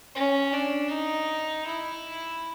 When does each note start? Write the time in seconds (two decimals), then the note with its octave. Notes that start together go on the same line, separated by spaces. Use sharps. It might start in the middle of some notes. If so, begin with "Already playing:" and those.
0.15 C#4
0.53 D4
0.90 D#4
1.67 E4